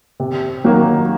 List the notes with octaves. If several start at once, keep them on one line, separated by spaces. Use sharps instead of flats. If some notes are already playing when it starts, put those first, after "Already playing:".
C3
D#3 F#3 A#3